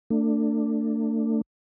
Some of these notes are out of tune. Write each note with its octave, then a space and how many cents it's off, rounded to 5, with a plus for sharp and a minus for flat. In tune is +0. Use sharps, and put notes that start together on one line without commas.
A3 +35 D4 +5